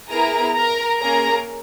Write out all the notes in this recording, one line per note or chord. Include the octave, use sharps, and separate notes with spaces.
B3 E4 G#4 A#4 A#5
A#4 A#5
A#3 C#4 G#4 A#4 A#5